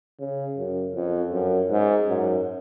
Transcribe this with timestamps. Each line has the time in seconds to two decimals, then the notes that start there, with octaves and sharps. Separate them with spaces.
0.20 C#3
0.57 F#2
0.95 F2
1.33 F#2
1.71 G#2
2.08 F#2